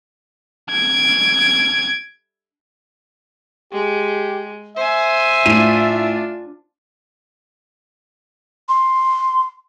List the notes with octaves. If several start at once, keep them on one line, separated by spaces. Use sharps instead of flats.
G#6 D7
G#3 G4
C5 E5 G#5
A2 D4 F4 D#7
C6